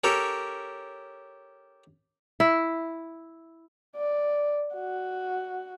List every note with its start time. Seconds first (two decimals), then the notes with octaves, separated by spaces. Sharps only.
0.04 C#4 G4 A4 A#4 C#5
2.40 E4
3.96 D5
4.75 F#4